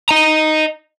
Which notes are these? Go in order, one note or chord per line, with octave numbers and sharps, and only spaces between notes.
D#5 A#5